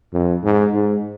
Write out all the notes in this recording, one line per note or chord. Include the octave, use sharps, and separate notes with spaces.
F2
G#2
G#2